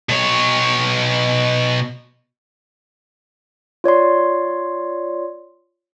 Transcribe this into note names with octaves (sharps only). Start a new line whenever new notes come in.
B2 C#5
F4 C#5 D5 C6